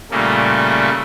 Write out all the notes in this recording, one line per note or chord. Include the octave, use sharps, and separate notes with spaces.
A#2 C#3 G3 A3 A#3